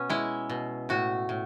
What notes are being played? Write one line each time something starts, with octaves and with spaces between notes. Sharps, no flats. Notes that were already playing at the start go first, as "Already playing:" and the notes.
Already playing: B2 B3 C#4
G#3 E4
B2
A2 F#4
A2